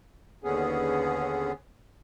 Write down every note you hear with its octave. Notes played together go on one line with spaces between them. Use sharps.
D#2 D3 B3 C#4 G#4